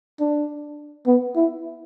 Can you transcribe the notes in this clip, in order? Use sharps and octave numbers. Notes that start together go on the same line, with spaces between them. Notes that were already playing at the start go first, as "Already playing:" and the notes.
D4
B3
E4